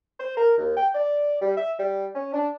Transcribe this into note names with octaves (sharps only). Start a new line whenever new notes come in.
C5
A#4
D#2
G5
D5
G3
E5
G3
C#4
D4